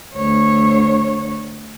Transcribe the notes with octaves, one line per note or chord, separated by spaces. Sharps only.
D2 C#5